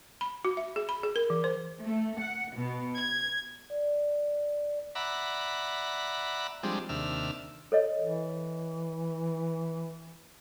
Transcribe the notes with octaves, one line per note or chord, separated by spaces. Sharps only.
B5
F#4
E5
G#4
B5
G#4
A#4
E3
C5
A3
F#5
B2
G#6
D5
D5 E5 F#5 A#5 B5
F3 G3 G#3 C4 D4
D#2 C3 D4 E5 F6
A4 C#5 D#5
E3